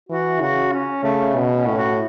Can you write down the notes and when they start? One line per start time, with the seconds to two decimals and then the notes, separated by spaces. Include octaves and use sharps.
0.09 E3 F#4
0.40 C#3 F#4
0.72 C#4
1.03 C#3 A3
1.35 B2
1.55 C#4
1.67 A2
1.77 F#4